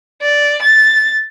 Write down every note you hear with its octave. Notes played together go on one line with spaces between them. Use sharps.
D5
A6